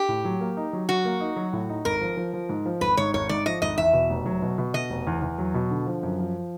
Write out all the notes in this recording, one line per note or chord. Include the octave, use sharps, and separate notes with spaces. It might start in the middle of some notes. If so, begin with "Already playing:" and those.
Already playing: G4
A2
F#3
A#3
D#4
F#3
F#3 F#4
A#3
D#4
F#3
A2
D#4
G#1 A#4
F3
F3
F3
G#2
F3
G#1 B4
G#2 C#5
G#1 C#5
G#2 D5
F3 D#5
G#1 D#5
E2 E5
B2
F1
F#3
B2
B2
B2 D#5
F1
E2
E2
F#3
B2
D3
F3
F#2
F3